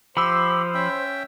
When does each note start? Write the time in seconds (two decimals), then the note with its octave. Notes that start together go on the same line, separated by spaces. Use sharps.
0.17 F3 G4 C5 B5 E6
0.74 C#4 E5 G5